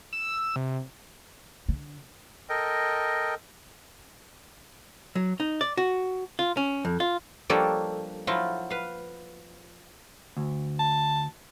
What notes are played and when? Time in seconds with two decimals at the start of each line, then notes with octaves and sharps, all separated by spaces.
0.13 E6
0.56 C3
1.68 D3
2.49 A4 A#4 D#5 G5
5.15 F#3
5.40 D#4
5.61 D5
5.77 F#4
6.39 F4
6.57 C#4
6.85 F2
7.00 F4
7.49 F3 G3 A#3 D4 A4 C#5
8.27 F3 F#3 E4 F4
8.70 B4 F5
10.37 D2
10.79 A5